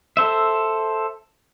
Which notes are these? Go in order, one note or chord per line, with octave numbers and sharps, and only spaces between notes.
A4 C5 E5